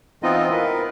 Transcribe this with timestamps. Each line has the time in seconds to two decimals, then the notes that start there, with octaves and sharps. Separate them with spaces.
0.23 E3 B3 C4 D#4 F4 D#5
0.50 A#4 B4